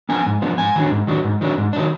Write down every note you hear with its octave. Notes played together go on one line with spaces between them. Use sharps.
F3 B3 D4 G#5
G#2
F3 B3 D4
G#2 G#5
D#3 F#3 D4
G#2
D#3 F#3 D4
G#2
D#3 F#3 D4
G#2
D#3 F#3 D4